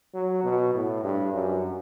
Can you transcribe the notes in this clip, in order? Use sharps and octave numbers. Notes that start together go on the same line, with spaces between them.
F#3
B2
A2
G2
F#2